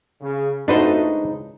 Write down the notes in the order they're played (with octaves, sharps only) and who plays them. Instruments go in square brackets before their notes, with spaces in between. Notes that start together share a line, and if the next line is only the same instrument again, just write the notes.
[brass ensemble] C#3
[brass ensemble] F2 A3 F#4 [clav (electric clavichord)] D4 B4 C5 [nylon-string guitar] D#4 D#5
[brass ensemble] C#2